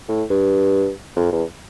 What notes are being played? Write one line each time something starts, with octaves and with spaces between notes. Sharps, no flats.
A2
G2
F2
E2